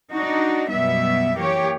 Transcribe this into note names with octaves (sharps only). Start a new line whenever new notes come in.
D4 D#4 F#4
F#2 B2 G3 B3 E5
E3 A#3 G4 C#5